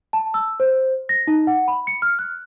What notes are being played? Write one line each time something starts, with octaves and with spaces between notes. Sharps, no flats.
A5
E6
C5
A#6
D#4
F#5
B5
C#7
F6
F#6